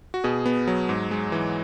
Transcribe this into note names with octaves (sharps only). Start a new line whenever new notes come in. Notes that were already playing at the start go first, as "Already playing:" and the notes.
F#4
B2 G#4
B3
F#3
G#2
G#3
E3